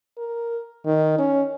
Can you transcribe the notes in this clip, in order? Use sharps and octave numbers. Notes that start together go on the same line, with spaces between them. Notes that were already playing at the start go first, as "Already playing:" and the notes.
A#4
D#3
C#4